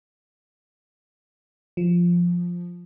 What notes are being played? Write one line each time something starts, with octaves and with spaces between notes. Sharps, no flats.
F3